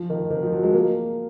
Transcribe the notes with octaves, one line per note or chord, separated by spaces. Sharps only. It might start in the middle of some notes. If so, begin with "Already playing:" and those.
Already playing: F3
D#3
D#3
F3
F#3
G#3
A#3